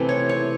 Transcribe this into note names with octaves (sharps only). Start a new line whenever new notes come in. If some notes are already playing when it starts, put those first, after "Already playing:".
Already playing: C3 E3 A3 C4
C#5
C#5